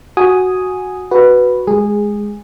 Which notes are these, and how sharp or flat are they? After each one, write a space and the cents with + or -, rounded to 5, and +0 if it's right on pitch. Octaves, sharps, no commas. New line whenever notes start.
F#4 +0 G#5 +0 D#6 +0
F#4 +0 B4 +0
G#3 +0 G#4 -15